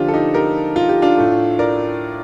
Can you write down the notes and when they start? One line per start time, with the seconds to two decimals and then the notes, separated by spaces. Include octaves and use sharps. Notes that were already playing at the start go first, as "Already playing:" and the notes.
Already playing: D3 F3 A#3 D4 F4 G4
0.08 A4
0.13 D#4 G4
0.34 G4 A#4
0.76 F4
0.89 G4
1.02 D4 F4
1.18 A2 A3
1.59 A#4 D5